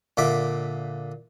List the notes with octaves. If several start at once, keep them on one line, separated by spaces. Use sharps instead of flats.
A#2 D3 E5 D6